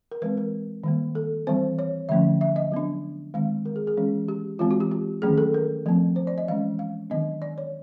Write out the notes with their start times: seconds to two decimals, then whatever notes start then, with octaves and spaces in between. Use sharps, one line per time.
0.12 A#4
0.22 E3 G#3 C4 B4
0.37 A#4
0.84 D#3 G3 A#3
1.15 A4
1.47 E3 G3 C4 C5
1.79 C#5
2.09 D3 F3 A3 C#4 E5
2.41 E5
2.56 D#5
2.72 F#3 B3 D4
3.34 D#3 G#3 C4 F5
3.66 A#4
3.76 G#4
3.87 G#4
3.97 E3 G#3 C#4
4.28 G4
4.59 E3 G#3 C4 F4
4.71 F#4
4.80 G4
4.91 G4
5.22 D#3 F#3 A3 C#4 G#4
5.38 A4
5.54 A#4
5.86 F3 A3 C4
6.16 C5
6.27 D5
6.38 D#5
6.48 E3 G#3 C#4 F5
6.79 F5
7.10 D#3 F#3 B3 D4 D#5
7.42 D5
7.58 C#5